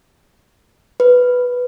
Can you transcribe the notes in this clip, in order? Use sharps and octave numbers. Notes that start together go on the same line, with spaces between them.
B4